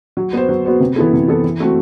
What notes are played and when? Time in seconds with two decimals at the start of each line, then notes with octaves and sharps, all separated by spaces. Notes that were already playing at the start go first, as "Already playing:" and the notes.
0.17 F#3
0.33 B3 F#4 C5
0.49 F#3
0.65 B3 F#4 C5
0.80 C3
0.96 E3 B3 E4 A4
1.13 C3
1.28 E3 B3 E4 A4
1.43 E3
1.60 A3 C4 F#4